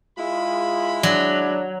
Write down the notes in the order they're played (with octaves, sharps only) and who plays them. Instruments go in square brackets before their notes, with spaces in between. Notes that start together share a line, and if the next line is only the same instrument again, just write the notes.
[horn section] G#3 E4 B5 [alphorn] F4
[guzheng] F#3 [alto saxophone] D4